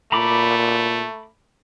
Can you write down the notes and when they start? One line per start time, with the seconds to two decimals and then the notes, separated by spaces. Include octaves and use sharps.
0.12 A#2 A3 A#5 B5 D6